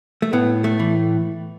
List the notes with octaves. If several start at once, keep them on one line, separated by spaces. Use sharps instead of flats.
A3
A2 B3
A3
E3